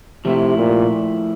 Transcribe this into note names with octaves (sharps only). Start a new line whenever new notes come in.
C3 F3 A3 E4
A#2